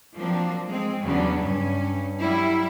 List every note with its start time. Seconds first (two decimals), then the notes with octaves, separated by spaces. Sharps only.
0.15 F3 F#3 A#3 C4 D4
0.67 G#3 C4
1.02 E2 C#3 F#3 G3 B3 D4
1.38 G2 C#4
2.19 F#3 G3 E4